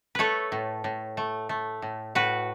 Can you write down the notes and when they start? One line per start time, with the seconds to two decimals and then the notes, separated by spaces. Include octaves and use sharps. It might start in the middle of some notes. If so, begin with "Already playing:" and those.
0.15 A3 A4 B4 C#5
0.52 A2
0.84 A2
1.17 A3
1.49 A3
1.82 A2
2.15 A2 F#4 B4